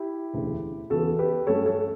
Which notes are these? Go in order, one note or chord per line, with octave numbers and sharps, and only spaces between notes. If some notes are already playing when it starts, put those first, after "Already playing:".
Already playing: E4 G4
E1 D2 C#3
E2 C#3 E3 B3 F#4 A4
G4 B4
G2 F#3 A3 C#4 A4 C#5
A4 C#5